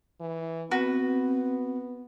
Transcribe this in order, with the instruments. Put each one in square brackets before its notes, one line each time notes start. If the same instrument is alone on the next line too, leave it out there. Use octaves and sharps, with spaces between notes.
[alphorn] E3
[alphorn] B3 [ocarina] C4 [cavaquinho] F#4 B4